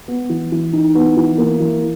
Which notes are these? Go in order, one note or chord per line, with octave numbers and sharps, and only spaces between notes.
B3
E3
E3
D#4
B3
E3
A#3
E3